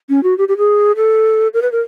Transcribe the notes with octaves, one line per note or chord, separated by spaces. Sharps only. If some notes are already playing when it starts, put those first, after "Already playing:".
C#4
F#4
G4
G4
G#4
A4
A#4
B4
A#4